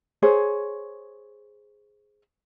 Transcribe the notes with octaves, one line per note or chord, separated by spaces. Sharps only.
G#4 C5 C#5